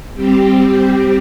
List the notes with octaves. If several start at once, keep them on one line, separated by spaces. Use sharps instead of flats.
G3 C4 G4